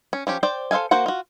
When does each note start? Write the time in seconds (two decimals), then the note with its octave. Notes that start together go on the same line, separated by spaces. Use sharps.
0.13 C#4
0.27 F3 C#4 G4
0.43 C5 D5 G5
0.71 A4 C5 E5 F5 G#5
0.91 A#3 F#4 C5 F#5
1.06 F4 F#4